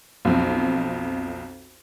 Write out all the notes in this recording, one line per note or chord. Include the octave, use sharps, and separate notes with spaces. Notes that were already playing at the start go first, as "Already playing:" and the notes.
B1 F2